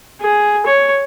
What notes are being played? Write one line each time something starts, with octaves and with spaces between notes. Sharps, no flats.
G#4
C#5